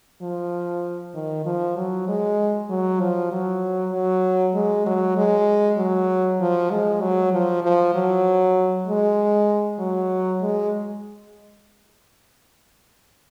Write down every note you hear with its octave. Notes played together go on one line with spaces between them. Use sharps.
F3
D#3
F3
F#3
G#3
F#3
F3
F#3
F#3
G#3
F#3
G#3
F#3
F3
G#3
F#3
F3
F3
F#3
G#3
F#3
G#3